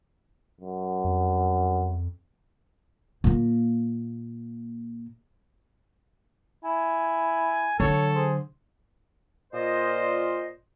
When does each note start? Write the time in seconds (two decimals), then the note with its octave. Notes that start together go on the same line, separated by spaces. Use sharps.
0.61 F#2
1.04 F2
3.24 A#2 A#3
6.65 E4 G#5
7.80 D3 F#3 A4 C#5
8.15 G#4 C5
9.53 A#2 F4 C5 D#5